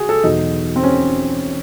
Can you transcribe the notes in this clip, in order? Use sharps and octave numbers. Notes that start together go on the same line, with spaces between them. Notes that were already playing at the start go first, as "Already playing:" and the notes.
Already playing: C#3 F#4 G#4
A4
E1 E2 B2 F#3 D#4
C4
C#4